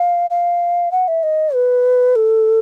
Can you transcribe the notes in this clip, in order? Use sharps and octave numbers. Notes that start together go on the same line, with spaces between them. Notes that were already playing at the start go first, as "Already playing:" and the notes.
Already playing: F5
F5
F#5
E5
D#5
B4
A4